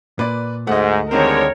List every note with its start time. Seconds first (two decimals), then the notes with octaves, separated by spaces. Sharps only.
0.19 A#2 B4 D5
0.67 D2 G#2 A3 D#5 F#5
1.11 D3 D#3 G3 G#3 C4 A#4 C#5